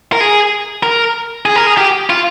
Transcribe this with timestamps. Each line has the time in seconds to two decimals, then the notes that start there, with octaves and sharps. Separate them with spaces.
0.13 A#4
0.20 G#4
0.83 A#4
1.46 G#4
1.56 A#4
1.67 G#4
1.77 G4
2.10 F4